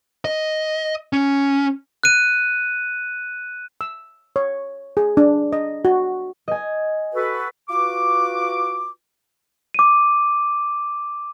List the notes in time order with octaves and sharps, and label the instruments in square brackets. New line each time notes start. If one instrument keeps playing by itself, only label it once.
[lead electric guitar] D#5
C#4
[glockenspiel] F#6 D#7
[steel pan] E6
C#5
G#4
D4
D#5
F#4
[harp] D#5 G#5
[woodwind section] F#4 A4 B4
F4 F#4 B4 D6
[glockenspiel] D6 D#7